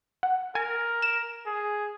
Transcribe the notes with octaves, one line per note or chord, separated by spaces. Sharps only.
F#5
A#4 G#5
E7
G#4